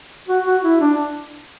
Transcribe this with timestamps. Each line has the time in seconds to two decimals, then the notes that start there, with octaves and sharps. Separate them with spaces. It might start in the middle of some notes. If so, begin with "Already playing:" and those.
0.29 F#4
0.46 F#4
0.64 E4
0.81 D4